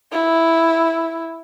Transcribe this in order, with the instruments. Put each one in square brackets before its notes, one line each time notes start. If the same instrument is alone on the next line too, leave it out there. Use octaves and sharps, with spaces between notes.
[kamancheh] E4